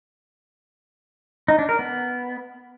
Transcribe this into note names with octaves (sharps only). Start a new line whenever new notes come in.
D#4
D4
A#4
B3